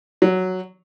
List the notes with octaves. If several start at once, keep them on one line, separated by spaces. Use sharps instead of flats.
F#3